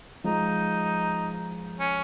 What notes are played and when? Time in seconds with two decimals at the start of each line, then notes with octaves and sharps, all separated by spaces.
0.24 F3 G#3 D#4
1.80 C#4